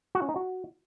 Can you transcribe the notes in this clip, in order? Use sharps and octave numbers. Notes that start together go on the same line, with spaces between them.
F#4
C#4
D#4
F#4